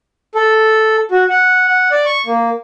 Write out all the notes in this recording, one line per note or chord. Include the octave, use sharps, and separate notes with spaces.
A4
F#4
F#5
F#5
D5
C#6
A#3